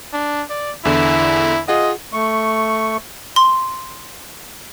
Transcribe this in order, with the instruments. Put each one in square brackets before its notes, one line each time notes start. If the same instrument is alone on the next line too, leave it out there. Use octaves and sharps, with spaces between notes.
[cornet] D4
D5
[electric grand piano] E2 D3 [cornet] E4
[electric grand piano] F4 G#4 F#5 [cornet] D#5
[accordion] A3 C#6
[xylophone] C6